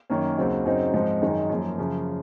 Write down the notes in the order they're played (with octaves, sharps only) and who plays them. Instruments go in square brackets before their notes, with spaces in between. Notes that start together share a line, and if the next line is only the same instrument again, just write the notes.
[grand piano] F#2 D#3 A#3 C#4
D#2 C#3 F#3 C4 D#4
F#2 C#3 F#3 C4 D#4
G#2 F3 C4 D#4
F#2 D#3 G#3 D#4
F#2 F3 A#3
F#2 C#3 F3